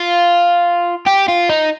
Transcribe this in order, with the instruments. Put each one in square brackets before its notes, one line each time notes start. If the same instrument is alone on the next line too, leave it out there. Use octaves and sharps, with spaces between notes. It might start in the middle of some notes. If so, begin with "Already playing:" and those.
Already playing: [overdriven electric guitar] F4
G4
F4
D#4